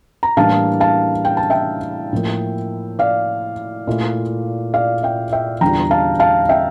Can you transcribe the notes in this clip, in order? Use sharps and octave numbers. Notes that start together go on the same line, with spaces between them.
A#5
A2 E3 G3 A#3 D4 F5 A5
F5 A5
G5
A5
E5 G5
A2 F3 A#3
D5 F5
A#2 A3 E4
D5 F5
E5 G5
E5 G5
E2 D3 G3 D4 F4 G5 A#5
F5 A5
F5 A5
E5 G5